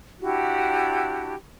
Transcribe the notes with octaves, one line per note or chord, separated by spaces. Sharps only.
D4 E4 F#4 G4